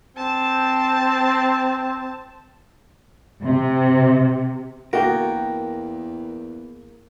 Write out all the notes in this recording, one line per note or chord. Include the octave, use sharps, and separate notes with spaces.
C4 A5
C3
E2 A#3 F#4 A#4 G5